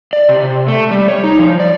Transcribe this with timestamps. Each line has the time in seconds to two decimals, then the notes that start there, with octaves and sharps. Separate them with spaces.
0.13 D5
0.29 C3
0.68 A3
0.91 G3
1.08 C#5
1.24 D#4
1.39 F3
1.60 D5